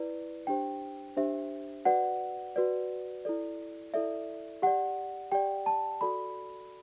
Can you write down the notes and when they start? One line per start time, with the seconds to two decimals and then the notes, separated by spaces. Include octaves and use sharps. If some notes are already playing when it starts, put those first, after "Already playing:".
Already playing: E4 B4 D5
0.47 D4 G4 C5 G5
1.17 D4 G4 C5 E5
1.85 F#4 B4 D5 F#5
2.56 F#4 B4 D5
3.25 E4 A4 D5
3.94 E4 A4 D5 E5
4.62 G4 D5 F#5
5.32 G4 D5 G5
5.66 A5
6.01 F#4 A4 D5 B5